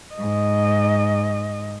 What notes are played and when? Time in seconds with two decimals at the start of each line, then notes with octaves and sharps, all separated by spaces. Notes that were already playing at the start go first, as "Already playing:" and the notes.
0.15 G#2 D#5